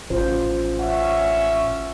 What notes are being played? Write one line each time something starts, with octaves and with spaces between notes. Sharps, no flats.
A1 C#4 F4 C5
C#4 E5 F#5